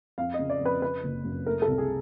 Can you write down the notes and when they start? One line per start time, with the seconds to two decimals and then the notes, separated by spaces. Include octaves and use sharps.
0.18 F2 F5
0.34 D#5
0.39 C#3
0.50 D5
0.61 F2 B4
0.82 C#3 B4
1.03 F#1
1.25 F#2
1.46 A3 A#4
1.62 A4
1.68 C2
1.78 G#4